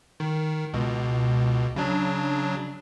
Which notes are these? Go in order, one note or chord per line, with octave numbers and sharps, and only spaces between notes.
D#3
C#2 B2
C#3 F#3 D4